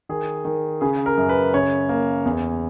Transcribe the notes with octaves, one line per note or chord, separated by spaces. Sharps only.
D#3 G#4
D#3
C#3 G#4
A#4
F#2
B4
C#3 C#5
A#3
E2